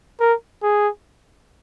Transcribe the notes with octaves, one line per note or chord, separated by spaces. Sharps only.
A#4
G#4